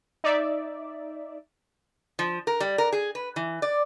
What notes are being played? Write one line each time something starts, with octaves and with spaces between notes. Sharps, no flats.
D#4 D5 E5
F3
A#4
G3
A#4
G#4
B4
E3
D5